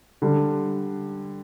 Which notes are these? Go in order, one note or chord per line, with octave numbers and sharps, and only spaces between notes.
D3 G3 D4